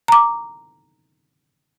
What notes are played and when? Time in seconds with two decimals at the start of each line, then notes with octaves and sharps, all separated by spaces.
0.08 A#5 D6